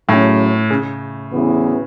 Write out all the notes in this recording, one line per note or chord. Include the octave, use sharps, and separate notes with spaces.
A2 C#3 F#3 C#4
C#3
D2 C#3 E3 B3 E4